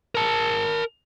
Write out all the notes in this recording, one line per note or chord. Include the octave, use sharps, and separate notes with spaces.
A#4 A5